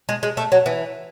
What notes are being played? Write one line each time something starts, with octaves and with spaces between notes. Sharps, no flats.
G#3
G#3
A3
F#3
E3